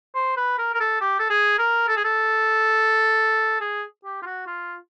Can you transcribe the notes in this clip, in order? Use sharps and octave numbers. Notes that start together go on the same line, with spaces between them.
C5
B4
A#4
A#4
A4
G4
A4
G#4
A#4
A4
G#4
A4
G#4
G4
F4
F#4
F4